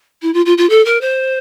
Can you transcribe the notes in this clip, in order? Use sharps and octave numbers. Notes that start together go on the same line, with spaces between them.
E4
F4
F4
F4
A4
A#4
C5